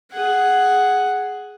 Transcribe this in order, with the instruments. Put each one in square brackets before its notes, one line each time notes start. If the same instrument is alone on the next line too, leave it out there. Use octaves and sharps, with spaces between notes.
[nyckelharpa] G#4 F#5